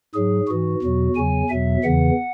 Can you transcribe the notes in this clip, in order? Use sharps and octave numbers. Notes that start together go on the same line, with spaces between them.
G#2 F#3 G#4
G#2 E3 F#4
E2 B2 F#3
E2 C#3 F#3 G#5
E2 B2 F#3 E5
E2 C#3 E3 F#5